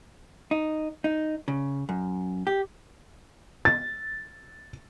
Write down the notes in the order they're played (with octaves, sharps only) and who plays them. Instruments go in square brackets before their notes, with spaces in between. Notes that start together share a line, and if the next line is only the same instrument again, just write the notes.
[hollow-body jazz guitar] D#4
D#4
C#3
F#2
G4
[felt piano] A6